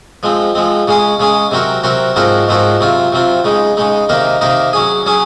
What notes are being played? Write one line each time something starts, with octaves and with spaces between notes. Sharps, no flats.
F3 G#3 C4
F3 G#3 C4
C#3 G#3 C#4 G#4
C#3 G#3 C#4 G#4
C3 F#3 C4 F#4 A#4
C3 F#3 C4 F#4 A#4
G#2 F3 C4 F#4 A#4
G#2 F3 C4 F#4 A#4
C3 F#3 C4 F4
C3 F#3 C4 F4
C#3 G#3 D#4
C#3 G#3 D#4
C3 D#3 A#3 D#4 A#4
C3 D#3 A#3 D#4 A#4
F#3 C#4 G#4
F#3 C#4 G#4